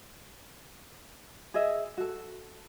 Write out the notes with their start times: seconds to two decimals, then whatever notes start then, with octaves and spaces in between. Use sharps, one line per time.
1.54 G#4 D#5 E5
1.97 F#4 A4